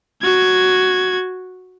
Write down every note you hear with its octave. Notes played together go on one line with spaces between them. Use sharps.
F#4 G#6